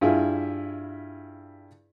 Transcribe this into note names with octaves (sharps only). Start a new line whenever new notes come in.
G2 E4 F4 G#4